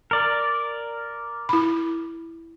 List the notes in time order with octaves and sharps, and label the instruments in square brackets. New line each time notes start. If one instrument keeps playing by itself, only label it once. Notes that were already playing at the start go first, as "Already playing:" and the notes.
[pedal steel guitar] A#4 D5
[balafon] E4 B5